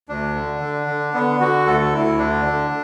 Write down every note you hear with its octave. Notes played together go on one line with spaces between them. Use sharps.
D2 D4
D3
D3
D3
D3 B3
D3 F#4
D2 A4
D2 E4
D3 D4
D3